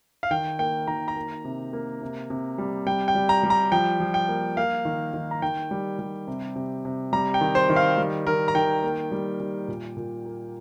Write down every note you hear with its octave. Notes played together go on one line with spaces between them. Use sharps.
F5
D#3 G5
A#3 G5
D#3 A#5
A#5
A#3
C3
A#3
C3
C3
G3
G3 G5
G5
G3
A#5
G3
A#5
F3 G5
F3
G5
A#3
A#3 F5
D#3
D#3
A#5
D#3 G5
G3
G3
C3
C3
C3
G3 A#5
G5
D#3
C5
D#3
F5
G3
D#3 A#4
A#5
D#3 G5
A#3
G3
G3
A#2
A#2
A#3